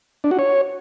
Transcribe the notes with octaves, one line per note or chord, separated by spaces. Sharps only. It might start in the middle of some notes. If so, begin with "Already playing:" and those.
D4
F#4
C#5